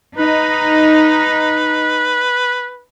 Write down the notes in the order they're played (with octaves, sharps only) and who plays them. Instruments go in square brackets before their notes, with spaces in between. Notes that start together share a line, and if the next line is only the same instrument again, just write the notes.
[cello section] D#4 [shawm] B4